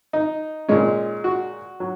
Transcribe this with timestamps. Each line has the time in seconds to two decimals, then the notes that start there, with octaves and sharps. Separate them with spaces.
0.13 D#4
0.68 A#2 G#3 C#4
1.24 F#4
1.80 F#3